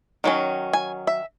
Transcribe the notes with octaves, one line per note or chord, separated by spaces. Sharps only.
D#3 F#3 C#4
G#5
E5